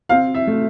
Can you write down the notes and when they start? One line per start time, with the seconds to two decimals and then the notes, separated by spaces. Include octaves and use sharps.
0.09 C4 F5
0.34 E5
0.47 A3